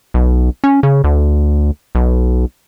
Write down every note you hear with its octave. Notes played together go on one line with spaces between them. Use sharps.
B1
C#4
C#3
D2
B1